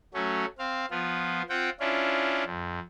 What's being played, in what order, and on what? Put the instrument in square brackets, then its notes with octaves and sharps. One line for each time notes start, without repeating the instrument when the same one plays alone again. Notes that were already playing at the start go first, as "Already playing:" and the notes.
[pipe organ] F#3 A3 C#4
C4 F5
F3 B3 F4
C4 F4 F#5 G5
C#4 D4 E4 F4
F2